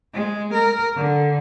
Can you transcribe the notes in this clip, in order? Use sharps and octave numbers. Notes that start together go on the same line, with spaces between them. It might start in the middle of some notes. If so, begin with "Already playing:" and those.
G#3
A#4
D3